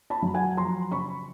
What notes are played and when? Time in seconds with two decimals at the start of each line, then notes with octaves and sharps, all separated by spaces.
0.10 A5 B5
0.22 F#3
0.34 F#5 G#5
0.57 F3 A#5 C6
0.91 C#3 B5 C#6